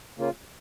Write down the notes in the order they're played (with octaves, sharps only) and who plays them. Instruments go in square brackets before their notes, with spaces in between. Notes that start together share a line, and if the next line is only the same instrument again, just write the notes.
[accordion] C#3 A#3 F4